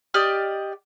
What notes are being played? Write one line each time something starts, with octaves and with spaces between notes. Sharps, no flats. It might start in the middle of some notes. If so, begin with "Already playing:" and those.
G4 D5 D#5 F6